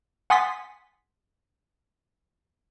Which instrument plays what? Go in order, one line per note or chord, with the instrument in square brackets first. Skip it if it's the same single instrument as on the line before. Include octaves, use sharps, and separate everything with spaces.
[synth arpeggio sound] F#5 G#5 C6 D#6 A6 B6